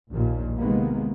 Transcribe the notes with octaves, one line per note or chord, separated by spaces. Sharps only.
A#1 D#2 A#2
C3 D#3 G#3 A#3 B3